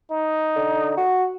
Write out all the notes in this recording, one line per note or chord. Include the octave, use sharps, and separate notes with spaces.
D#4
D3
F#4